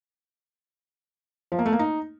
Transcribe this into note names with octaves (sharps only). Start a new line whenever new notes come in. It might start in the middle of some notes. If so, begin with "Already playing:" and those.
F3
A#3
A3
A#3
D#4